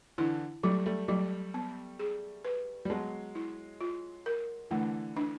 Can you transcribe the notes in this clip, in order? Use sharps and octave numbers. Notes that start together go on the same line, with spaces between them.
D3 E3 E4
F#3 G3 A3
G3 A3
F#3 G3 A3
B3
G#4
B4
G3
F#3 G#3 B3
E4
F4
A#4
D3 E3 A3
D4